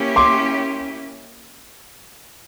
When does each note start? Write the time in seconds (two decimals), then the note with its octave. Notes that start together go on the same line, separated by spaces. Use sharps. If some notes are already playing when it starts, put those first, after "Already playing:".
Already playing: A#3 C#4 E4 G4
0.16 C6 D6